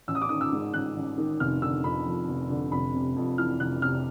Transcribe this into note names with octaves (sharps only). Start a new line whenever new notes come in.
A1 E6
D#6
D6
D#3 D#6
E6
G#2
A1 F#6
A1
D#3
F1 F6
D3 E6
F2 B5
F3
F1
D3
F1 B5
C3
F2
E3 F6
F1 F#6
C3 F6